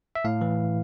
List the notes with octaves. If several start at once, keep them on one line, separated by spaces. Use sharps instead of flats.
E5
A2 F5
E3